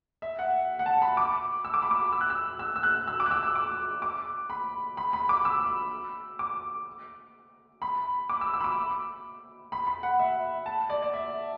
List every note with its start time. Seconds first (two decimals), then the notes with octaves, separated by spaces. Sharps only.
0.22 E5
0.39 F#5
0.79 F#5
0.86 A5
1.02 B5
1.17 D6
1.64 E6
1.74 D6
1.82 B5
1.91 D6
2.12 E6
2.21 F#6
2.30 E6
2.59 E6
2.76 E6
2.83 F#6
3.08 E6
3.20 D6
3.26 F#6
3.31 E6
3.43 E6
3.55 D6
4.02 D6
4.50 B5
4.97 B5
5.13 B5
5.29 D6
5.45 E6
6.39 D6
7.82 B5
8.30 D6
8.41 E6
8.54 E6
8.61 B5
8.64 D6
9.72 B5
9.87 B5
10.03 F#5
10.19 E5
10.66 A5
10.90 D5
11.03 D5
11.14 E5